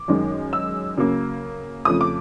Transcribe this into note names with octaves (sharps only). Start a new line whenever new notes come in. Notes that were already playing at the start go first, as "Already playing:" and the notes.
Already playing: D6
F#2 D#3 G#3
E6
C#3 F#3 A#3
F2 C#3 F3 A3 D#6
D6